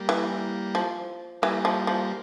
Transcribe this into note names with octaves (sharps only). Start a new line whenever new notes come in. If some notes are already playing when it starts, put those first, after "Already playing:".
Already playing: G3 A#3
E3
F3
E3 G3 A#3
F3
F3